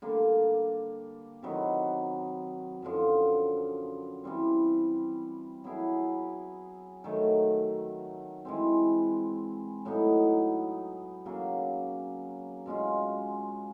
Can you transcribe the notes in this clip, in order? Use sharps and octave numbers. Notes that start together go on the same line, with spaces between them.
D3 G3 A#3 D4
C3 D#3 F#3 B3
F#2 D3 F3
E3 G3 C4
F#3 B3 E4 G#4
D#3 F#3 A3
E3 G#3 C4
A2 F#3 B3 D#4
C#3 F#3 A#3
B2 G#3 C#4 F4